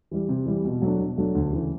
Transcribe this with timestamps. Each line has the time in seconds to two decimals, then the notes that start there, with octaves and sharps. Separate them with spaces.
0.11 E3 G3
0.29 C3
0.46 E3 G3
0.64 B2
0.82 F#3 A3 D4
0.99 B2
1.17 F#3 A3 D4
1.35 D2
1.52 C#3 E3